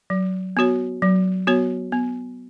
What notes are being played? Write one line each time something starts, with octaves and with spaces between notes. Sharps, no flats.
F#3
B3 F#4 C#5
F#3
B3 F#4 C#5
B3